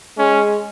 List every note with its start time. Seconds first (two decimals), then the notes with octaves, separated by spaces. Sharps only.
0.18 G#3 C#4